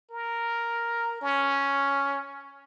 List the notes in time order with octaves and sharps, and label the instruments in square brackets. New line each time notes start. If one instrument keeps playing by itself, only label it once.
[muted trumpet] A#4
C#4